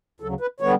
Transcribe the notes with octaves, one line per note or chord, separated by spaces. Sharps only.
D2 C#3 F#3 A4
B4
D3 G3 B3 C#5